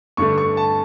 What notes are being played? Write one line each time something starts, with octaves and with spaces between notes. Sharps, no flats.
G2 D3 A3 C#6
C#6
A5